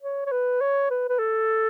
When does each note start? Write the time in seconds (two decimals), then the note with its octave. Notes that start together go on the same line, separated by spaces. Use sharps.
0.03 C#5
0.26 C#5
0.32 B4
0.61 C#5
0.90 B4
1.09 B4
1.19 A4